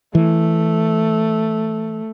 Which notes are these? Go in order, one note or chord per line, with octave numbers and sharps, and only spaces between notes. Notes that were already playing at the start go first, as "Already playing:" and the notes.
E3 A3